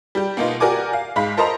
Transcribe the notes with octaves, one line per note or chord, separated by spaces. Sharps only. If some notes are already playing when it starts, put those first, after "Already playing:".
G3 G4
B2 A#3 B3 D#4 F4
F#4 G4 A#4 D5 G#5 D6
F5
G#2 G#3 F5 B5 B6
A4 A#4 C5 D#5 A5 A#5